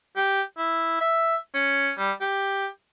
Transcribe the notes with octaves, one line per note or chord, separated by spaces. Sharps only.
G4
E4
E5
C#4
G3
G4